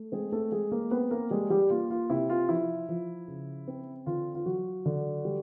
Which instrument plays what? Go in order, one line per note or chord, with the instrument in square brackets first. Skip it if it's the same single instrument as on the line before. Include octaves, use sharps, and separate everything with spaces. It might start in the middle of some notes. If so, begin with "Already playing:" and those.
Already playing: [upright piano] A3
G#3 C4 G#4
A3 A4
G#3 G#4
A#3 A#4
B3 C4 B4
A#3 A#4
G3 G#3 G#4
G3 G4
A#3 F4
F4
C3 E4
F4
F3 E4
F3
C#3
C4
D3 F4
F4
F#3 F#4
D3
G3